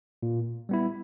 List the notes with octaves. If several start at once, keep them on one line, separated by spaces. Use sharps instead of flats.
A#2
G3 B3 E4